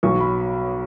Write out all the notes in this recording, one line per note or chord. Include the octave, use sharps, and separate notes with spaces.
B1 B2 F#3 C#6
B5